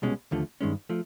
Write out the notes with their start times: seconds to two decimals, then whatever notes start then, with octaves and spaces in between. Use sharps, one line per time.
0.02 C2 B2 G#3 C#4
0.31 D#2 D3 F3 A3
0.61 G2 D#3 G#3 C#4
0.90 F3 A3